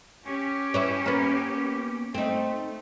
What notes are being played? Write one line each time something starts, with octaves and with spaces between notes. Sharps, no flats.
C#4 G4
E4 B4 C#5
A#3 B3
A3 C4 D#4